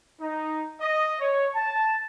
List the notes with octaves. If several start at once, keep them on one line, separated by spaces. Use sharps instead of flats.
D#4
D#5
C#5
A5